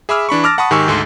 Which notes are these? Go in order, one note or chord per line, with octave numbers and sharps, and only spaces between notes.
G#4 E5 B5 D6 E6 F6
E3 D4 B5 C#6
A5 D6 E6 F6 A6 A#6
F#5 A5 B5 C#6 D#6
G#2 D#3 G4 G#5 C#6 E6
D2 G#2 A4 C6